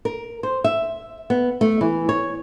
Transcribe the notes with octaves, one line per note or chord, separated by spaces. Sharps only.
A#4
C5
E5
B3
A3
E3
C#5